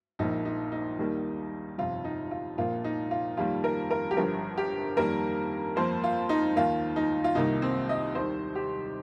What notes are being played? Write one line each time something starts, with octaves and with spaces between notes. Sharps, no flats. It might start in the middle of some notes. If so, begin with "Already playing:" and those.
A#1 A#2 F3 A#3 D#4
D#4
D#4
D#2 D#3 G3 A#3
G1 F2 C3 F4
D#4
F4
A#1 A#2 F3 A#3 F4
D#4
F4
F2 D#3 G3 A#3 F4
A#4
A#4
G4
G1 G2 F3 A#4
G4
F2 D#3 G3 A#3 A#4
F2 F3 A#3 C5
F4
D#4
D#2 D#3 A#3 F4
D#4
F4
C2 C3 D#3 A#3 D#4
C4
D#5
D#2 D#3 G3 C5
G4